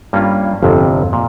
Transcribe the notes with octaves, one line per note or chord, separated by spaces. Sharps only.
G2 G3 A#3 C#4 F4
G1 F2 C3
A#2